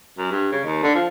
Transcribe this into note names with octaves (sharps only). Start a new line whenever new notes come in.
F#2
G2
C#3
D#2
D3
F3